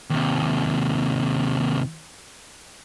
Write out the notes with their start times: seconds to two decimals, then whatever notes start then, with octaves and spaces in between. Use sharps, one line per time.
0.10 D#2 C3